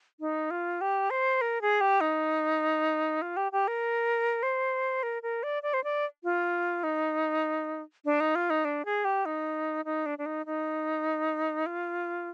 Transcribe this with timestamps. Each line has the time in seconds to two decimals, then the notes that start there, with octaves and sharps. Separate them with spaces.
0.20 D#4
0.51 F4
0.81 G4
1.10 C5
1.41 A#4
1.62 G#4
1.81 G4
2.01 D#4
3.22 F4
3.37 G4
3.52 G4
3.68 A#4
4.43 C5
5.03 A#4
5.23 A#4
5.43 D5
5.63 D5
5.74 C5
5.84 D5
6.24 F4
6.84 D#4
8.05 D4
8.20 D#4
8.35 F4
8.50 D#4
8.65 D4
8.85 G#4
9.05 G4
9.26 D#4
9.85 D#4
10.06 D4
10.18 D4
10.26 D#4
10.46 D#4
11.66 F4